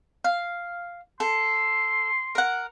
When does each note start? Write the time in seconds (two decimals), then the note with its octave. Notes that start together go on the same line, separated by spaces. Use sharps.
0.24 F5
1.20 A4 C6
2.35 A#4 F#5